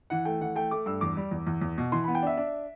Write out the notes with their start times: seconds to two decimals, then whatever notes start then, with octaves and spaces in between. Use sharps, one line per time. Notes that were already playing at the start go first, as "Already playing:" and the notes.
0.10 E3 F#5
0.25 A3 G5
0.41 E3 F#5
0.56 A3 G5
0.71 A3 D6
0.86 G2 E6
1.01 E2 D6
1.17 G3
1.31 E2
1.47 E2
1.61 E2
1.78 B2
1.92 E3 C6
2.04 B3 B5
2.15 G5
2.23 D4 E5
2.37 D4